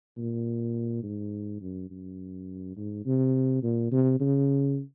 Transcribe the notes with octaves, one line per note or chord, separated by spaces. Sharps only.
A#2
G#2
F#2
F#2
G#2
C3
A#2
C3
C#3